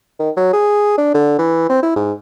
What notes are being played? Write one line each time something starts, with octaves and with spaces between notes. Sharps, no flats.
D#3
F#3
G#4
D4
D3
E3
C4
E4
G#2